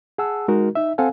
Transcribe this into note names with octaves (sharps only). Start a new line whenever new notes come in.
G#4 F#5 A5 E6
G#3 D#4 F#4 A#4
D#4 E5
C4 A4 F5 F#5 G#5